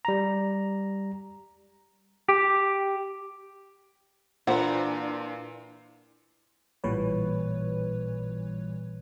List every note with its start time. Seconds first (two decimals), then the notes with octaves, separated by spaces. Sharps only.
0.05 G3 A#5
2.28 G4
4.47 A#2 E3 D4 F4 A#4 C5 F#5
6.84 A1 A#2 E3 G3 B4 C#5